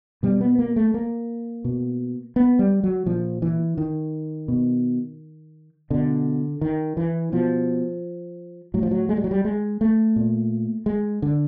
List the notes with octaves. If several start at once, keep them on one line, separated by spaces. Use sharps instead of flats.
B2 G3
B3
A#3
A3
A#3
B2
B3
G3
F#3
A#2 F3
E3
D#3
B2
B2 D3
D#3
E3
B2 F3
A2 F#3
F3
F#3
G#3
G3
F#3
G3
G#3
A3
A#2
G#3
D3